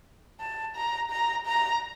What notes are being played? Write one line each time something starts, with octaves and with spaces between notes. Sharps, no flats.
A5
A#5
A#5
A#5